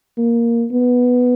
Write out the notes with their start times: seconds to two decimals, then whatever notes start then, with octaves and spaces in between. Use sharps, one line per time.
0.18 A#3
0.72 B3